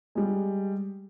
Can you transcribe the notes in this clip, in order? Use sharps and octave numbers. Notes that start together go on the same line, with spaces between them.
G3 G#3